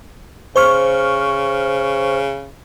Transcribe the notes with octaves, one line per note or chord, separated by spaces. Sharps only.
C#3 C5 C#6 F6